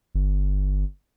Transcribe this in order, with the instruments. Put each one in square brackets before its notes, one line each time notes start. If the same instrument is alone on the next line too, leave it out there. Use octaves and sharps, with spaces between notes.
[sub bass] G1